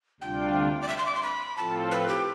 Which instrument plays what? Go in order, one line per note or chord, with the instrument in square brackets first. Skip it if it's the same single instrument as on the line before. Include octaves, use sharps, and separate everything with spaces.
[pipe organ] D2 C3 G3 D4 F4 [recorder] G5
[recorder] D5
E5
C6
D6
C6
B5
[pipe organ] A2 F3 C4 F4 A4 [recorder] A5
[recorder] B4
G4